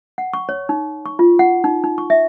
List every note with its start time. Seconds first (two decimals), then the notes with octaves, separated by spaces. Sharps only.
0.18 F#5
0.33 C#6
0.49 C#5
0.69 D#4
1.06 C#6
1.19 F4
1.39 F#5
1.64 D#4
1.84 D#4
1.98 C#6
2.10 E5